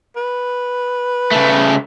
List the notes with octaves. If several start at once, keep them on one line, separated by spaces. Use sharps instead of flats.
B4
C#3 A3